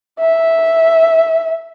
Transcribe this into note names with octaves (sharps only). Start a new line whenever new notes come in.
E5